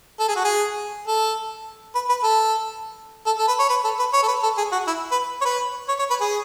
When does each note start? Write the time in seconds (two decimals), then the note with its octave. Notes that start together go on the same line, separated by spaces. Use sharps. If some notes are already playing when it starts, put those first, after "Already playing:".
0.20 A4
0.28 G#4
0.36 F#4
0.45 G#4
1.08 A4
1.95 B4
2.09 B4
2.24 A4
3.26 A4
3.39 A4
3.48 B4
3.59 C#5
3.69 B4
3.84 A4
3.99 B4
4.13 C#5
4.23 A4
4.28 B4
4.43 A4
4.58 G#4
4.72 F#4
4.87 E4
5.12 B4
5.41 C#5
5.45 B4
5.89 C#5
5.99 C#5
6.10 B4
6.21 G#4